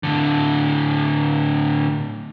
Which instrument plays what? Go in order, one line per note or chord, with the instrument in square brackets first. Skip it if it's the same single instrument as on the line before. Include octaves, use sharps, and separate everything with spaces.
[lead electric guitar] A2 D3